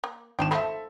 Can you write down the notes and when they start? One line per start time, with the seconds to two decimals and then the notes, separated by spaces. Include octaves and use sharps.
0.04 A#3
0.39 G#1 F3 D4 G5 E7
0.51 F3 A3 A4 E5 B5